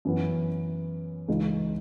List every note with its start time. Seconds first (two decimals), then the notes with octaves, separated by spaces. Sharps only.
0.05 F#2 E3 B3
1.28 C#2 C#3 E3 G#3 D#4